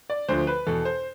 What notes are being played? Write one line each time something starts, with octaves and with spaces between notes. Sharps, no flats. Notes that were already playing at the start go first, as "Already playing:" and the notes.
D5
D2 D3 F3 C5
B4
E2 B2 A4
C5